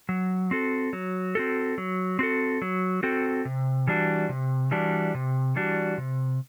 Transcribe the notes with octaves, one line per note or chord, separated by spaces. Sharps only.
F#3
C4 F#4 A4
F#3
C4 F#4 A4
F#3
C4 F#4 A4
F#3
C4 F#4 A4
C3
E3 G3 D4 F#4
C3
E3 G3 D4 F#4
C3
E3 G3 D4 F#4
C3